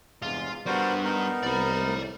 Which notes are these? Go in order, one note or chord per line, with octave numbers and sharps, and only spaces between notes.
E2 G2 C3 G#3 F4
G3 B3 D4 F#4 A#4 C5
B3 D#4 A#4
C2 D5 B5
A2